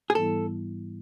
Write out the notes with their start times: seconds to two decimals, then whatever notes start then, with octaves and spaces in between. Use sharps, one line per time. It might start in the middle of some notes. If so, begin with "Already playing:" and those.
0.10 G#4
0.15 G#2 E3 G3 B3 E4 A4